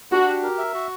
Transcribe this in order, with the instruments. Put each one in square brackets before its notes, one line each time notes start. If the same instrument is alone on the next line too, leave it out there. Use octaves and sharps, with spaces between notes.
[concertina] D4 [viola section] F#4
[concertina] G4
A#4
E5
F#4